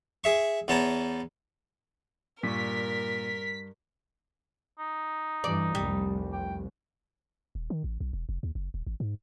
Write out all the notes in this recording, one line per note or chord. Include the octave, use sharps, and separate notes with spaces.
G#4 E5 C#6
E2 B3 C#5 A5 A#5
G2 A#2 A#4 C#6 B6
D#4
G2 E3 D5
F1 C2 G3
G5
D#1
D#3
A1
B1
E1
F1
D#2
F#1
D#1
G#1
G#2